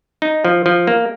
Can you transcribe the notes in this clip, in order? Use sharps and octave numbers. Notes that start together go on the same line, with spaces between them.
D#4
F3
F3
A#3